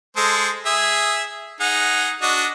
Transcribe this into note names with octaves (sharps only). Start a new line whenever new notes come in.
G#3 A4 C5
G#4 E5
D#4 G#4 F#5
D4 F#4 D#5